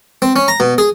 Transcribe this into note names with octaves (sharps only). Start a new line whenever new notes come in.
C4
C#4
A#5
B2
G#4